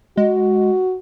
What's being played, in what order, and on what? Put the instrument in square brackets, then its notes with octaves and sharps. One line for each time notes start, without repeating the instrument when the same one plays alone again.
[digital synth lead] G#3 [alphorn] F#4